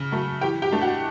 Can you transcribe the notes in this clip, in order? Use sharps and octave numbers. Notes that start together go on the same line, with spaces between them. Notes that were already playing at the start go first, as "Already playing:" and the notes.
Already playing: C#3
F#3 A3
E3 G4 G5
G4 G5
A3 D4
F#4 F#5